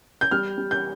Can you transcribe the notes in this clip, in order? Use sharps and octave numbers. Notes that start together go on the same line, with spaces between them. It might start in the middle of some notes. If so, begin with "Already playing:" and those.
G6
G3 F6
G3
G6